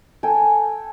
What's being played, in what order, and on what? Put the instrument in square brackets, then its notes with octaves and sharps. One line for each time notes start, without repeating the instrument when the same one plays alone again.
[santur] A4 G5 G#5